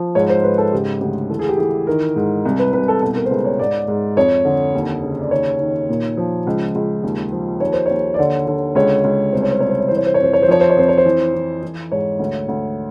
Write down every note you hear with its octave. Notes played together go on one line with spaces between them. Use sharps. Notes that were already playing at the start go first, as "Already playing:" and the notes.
Already playing: F3
G#2 C#5
C5
G#2 B4
A4
C#3 G4
D2 G4
E3 A4
G#4
G4
E3 G#4
D#3 A#4
G#2
C2
B4
C2 B4
A4
B2 A4
A#4
C5
C#2 B4
C#5
G#2 D5
G#2
F2 C#5
D3
D#2
C#3
D5
D#3 C#5
D#3
A#2
F3
C#2
C#2
D#2
F3
D#2 C#5
C5
D#2 C#5
D5
D3 C#5
D3
C#2 C#5
C#2
C2 C5
C#5
C5
C2 C#5
C5
C#5
E3 C5
C#5
C5
C#5
F2 C5
C#5
C5
F3 C#5
C5
C#5
F2 C5
C#5
C5
E3
E3
E3
G#2 C#5
D2
D2